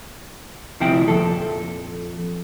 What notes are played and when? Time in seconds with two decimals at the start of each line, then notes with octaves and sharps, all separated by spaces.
0.80 D2 C3 F3 E4 G5
1.08 F2 A#2 A4